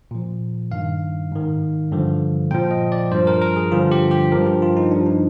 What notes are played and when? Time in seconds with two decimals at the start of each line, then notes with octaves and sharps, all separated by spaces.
0.11 A#2 F3
0.71 G2 D#3 F5
1.32 G#2 D#3
1.92 G2 D3 F3
2.51 A#2 F3 G5
2.71 D#5
2.92 D5
3.11 G2 F3 C5
3.27 A#4
3.41 A#4
3.56 G#4
3.71 G2 D3 F3 F4
3.91 G4
4.11 G4
4.32 G2 F3 A#4
4.47 G4
4.62 F4
4.77 D#4
4.91 G2 F3 D4
5.06 D#4